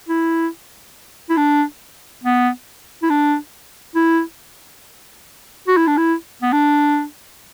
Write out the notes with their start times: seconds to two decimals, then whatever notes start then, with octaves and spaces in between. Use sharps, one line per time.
0.08 E4
1.29 E4
1.37 D4
2.23 B3
3.03 E4
3.10 D4
3.95 E4
5.68 F#4
5.77 E4
5.87 D4
5.97 E4
6.42 B3
6.52 D4